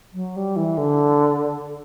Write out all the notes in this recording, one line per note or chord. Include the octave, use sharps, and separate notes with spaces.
F#3
G3
E3
D3